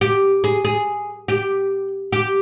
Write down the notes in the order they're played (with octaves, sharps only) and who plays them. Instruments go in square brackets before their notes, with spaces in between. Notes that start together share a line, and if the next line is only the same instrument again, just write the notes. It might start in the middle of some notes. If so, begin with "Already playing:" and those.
[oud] G4
G#4
G#4
G4
G4